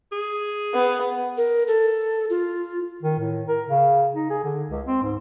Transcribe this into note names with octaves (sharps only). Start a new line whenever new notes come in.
G#4
B3
A#4
A4
F4
D#3
A2
A#4
C#3
D#4
G#4
D3
C#2
C4
G#2